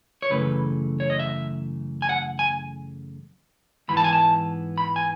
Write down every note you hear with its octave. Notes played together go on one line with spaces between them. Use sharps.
C#5
F#2 C#3 E3 A3 B4
C#5
D#5
E5
G#5
F#5
G#5
G#2 E3 B3 B5
A5
G#5
A5
B5
G#5